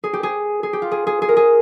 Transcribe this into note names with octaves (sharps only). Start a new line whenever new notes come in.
G#4
G4
G#4
G#4
G4
F4
G#4
G#4
G#4
A#4
G#4